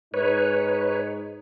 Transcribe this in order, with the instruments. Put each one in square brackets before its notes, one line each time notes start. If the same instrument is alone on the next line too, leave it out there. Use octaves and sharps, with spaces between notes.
[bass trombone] G#2 [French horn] D#4 [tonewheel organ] B4 C#5